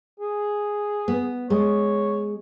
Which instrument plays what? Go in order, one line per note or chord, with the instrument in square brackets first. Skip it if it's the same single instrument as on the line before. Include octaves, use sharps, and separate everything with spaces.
[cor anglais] G#4
[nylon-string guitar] B3
[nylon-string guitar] G#3 [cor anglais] C#5